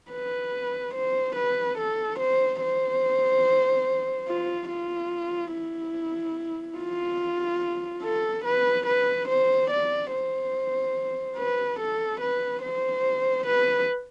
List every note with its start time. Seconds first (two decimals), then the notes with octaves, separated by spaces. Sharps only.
0.11 B4
0.94 C5
1.35 B4
1.78 A4
2.19 C5
2.61 C5
4.28 F4
4.69 F4
5.53 E4
6.78 F4
8.03 A4
8.45 B4
8.87 B4
9.28 C5
9.70 D5
10.12 C5
11.37 B4
11.79 A4
12.20 B4
12.62 C5
13.46 B4